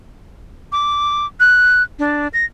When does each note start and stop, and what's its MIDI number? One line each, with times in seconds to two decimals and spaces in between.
0.72 1.26 86
1.40 1.82 90
1.99 2.28 62
2.34 2.45 94